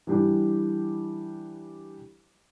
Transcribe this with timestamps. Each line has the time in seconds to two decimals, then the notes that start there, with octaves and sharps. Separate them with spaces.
0.07 E3 G3 D4 G4